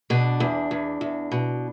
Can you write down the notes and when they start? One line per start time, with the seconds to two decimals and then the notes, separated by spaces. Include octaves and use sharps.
0.10 B2 D4
0.40 E2
0.71 E2
1.01 E2
1.32 B2